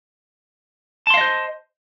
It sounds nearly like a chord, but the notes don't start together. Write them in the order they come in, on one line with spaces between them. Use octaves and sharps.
A5 C6 F5 D#5 C5